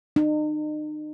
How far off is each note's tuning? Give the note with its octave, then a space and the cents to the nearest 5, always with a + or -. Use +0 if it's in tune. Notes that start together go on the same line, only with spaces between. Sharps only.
D#4 -40